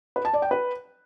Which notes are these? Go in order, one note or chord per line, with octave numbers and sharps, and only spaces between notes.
B4
A5
D5
G5
B4